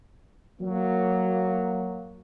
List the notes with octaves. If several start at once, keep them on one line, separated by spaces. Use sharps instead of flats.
F#3 A#3